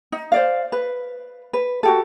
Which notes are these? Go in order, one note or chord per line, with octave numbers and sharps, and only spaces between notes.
D#4
C5 D5 F5
B4
B4
F#4 G4 A4